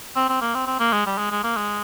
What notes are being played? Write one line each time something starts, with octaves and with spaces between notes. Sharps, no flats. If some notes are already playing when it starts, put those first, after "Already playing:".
C4
C4
A#3
C4
C4
A#3
G#3
G3
G#3
G#3
A#3
G#3